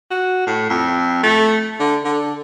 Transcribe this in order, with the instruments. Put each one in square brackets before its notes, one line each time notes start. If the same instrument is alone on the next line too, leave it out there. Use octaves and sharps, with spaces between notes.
[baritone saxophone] F#4
A2
F2
A3
D3
D3